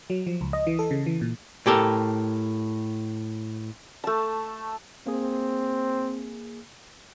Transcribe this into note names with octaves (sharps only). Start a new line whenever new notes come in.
F#3
F3
C#2
D#5
E3
A4
C#3
E3
A#2
A2 G4 A4 A#4
A3 A5
A#3 C4 G#4